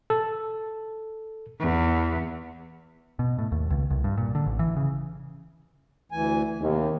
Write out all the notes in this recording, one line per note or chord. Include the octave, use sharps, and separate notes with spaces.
A4
E2
B2
A2
D#2
C#2
C2
G2
A#2
D3
A1
E3
C#3
D2 E3 G#5
D#2 C3